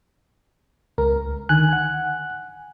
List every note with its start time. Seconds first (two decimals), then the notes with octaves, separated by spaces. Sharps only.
0.98 C#2 A#4
1.49 D3 D#3 G#5 F#6
1.69 F#5 G#5